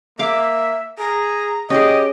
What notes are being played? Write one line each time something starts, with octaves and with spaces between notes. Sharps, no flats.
A#3 E5 F5 D6
G#4 A#5
C#4 G4 G#4 D#5